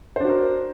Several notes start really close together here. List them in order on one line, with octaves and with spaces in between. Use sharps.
C5 D4 F#4 A#4